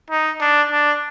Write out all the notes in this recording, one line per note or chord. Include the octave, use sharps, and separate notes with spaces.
D#4
D4
D4